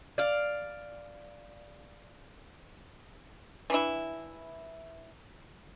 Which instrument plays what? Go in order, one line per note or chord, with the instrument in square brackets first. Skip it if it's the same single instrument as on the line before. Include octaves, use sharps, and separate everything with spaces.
[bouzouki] D5 F5
[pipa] E3 D4 E4